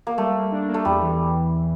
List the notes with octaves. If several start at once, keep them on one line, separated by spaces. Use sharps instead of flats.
A#3
G3 A3
A#3
D4
A#3
A3
E2 G3
E3